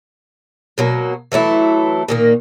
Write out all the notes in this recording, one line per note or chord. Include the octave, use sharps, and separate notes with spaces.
B2 F#3 A#3
E3 F#3 A3 E4
A#2 D#3 A#3